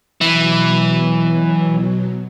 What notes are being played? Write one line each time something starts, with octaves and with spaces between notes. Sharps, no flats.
B2 E3 F#3